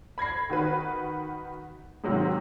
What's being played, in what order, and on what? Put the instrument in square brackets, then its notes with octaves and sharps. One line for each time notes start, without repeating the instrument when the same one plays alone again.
[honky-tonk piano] B5 G#6 A#6 C7
D#3 F#4 B4
G#2 C3 D#3 F#3